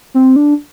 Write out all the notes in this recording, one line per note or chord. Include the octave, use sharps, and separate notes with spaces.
C4
D4